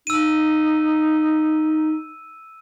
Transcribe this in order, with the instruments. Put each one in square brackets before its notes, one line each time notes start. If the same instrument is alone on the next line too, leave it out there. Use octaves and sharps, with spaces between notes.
[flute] D#4 [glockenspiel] E6 D#7